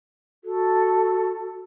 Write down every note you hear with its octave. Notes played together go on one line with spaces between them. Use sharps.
F#4 A4